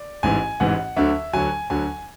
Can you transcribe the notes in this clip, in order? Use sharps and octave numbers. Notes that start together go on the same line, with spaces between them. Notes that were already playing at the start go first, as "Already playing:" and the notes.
Already playing: D5
A1 G#2 E3 G#5
A1 G#2 E3 F#5
D2 D3 F#3 E5
D2 D3 F#3 G#5
D2 D3 F#3 G#5